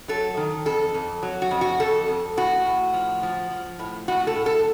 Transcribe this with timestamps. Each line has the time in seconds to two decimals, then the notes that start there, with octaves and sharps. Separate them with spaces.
0.08 F#3 A4
0.37 D#3
0.65 F2 A4
0.94 F2
1.23 F#3
1.42 F#4
1.51 F2
1.61 F#4
1.80 F2 A4
2.08 F2
2.37 A2 F#4
2.65 A2
2.94 F3
3.23 F3
3.51 F3
3.79 A2
4.08 A2 F#4
4.27 A4
4.36 A2
4.46 A4